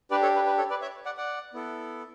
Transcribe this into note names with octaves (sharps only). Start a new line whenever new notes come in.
D4 G4 B4 D5
A4 C#5
B4
B4
A4 C#5
B4 D5
C#5 E5
D5 F#5
D5 F#5
B3 E4 A4